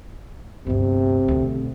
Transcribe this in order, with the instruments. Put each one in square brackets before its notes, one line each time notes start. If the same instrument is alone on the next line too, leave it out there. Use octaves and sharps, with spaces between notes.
[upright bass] G1 D2 [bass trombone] C3
[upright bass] D2 B2